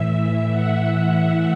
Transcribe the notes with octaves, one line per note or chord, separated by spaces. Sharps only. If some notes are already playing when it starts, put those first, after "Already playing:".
Already playing: A2 E3 E5
F#5